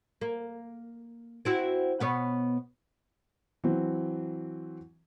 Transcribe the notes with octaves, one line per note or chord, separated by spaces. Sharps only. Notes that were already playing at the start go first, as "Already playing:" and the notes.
A#3
C4 E4 F#4
B2 B3 C#5
E3 F#3 C4